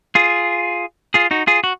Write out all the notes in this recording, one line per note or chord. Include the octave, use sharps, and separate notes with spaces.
F4 G#4
F4 G#4
D#4 F#4
F4 G#4
F#4